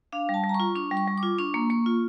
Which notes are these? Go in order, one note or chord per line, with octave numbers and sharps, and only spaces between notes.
D4 F5
G3
A5
G3
A#5
C#6
F4
D4 C#6
G3
C#6
G3
D6
F4
D4 C#6
A#3
A#3 C#6
F4